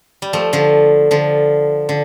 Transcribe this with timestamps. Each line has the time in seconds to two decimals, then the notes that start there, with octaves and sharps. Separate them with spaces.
0.22 G3
0.33 F3 A3
0.53 D3 F3
1.11 D3 F3
1.89 D3